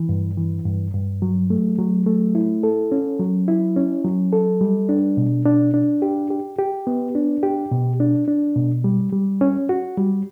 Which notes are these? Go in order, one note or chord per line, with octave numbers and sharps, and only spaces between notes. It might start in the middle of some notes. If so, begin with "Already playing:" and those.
Already playing: E3
G2
E3
G2
G2
F#3
A3
F#3
A3
E4
A4
C#4
F#3
E4
C#4
F#3
A4
G3
D4
B2
D4
D4
G4
G4
G4
B3
D4
G4
B2
D4
D4
B2
G3
G3
C#4
F#4
G3